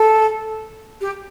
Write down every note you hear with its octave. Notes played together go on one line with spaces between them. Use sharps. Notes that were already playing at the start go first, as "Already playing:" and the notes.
Already playing: A4
G4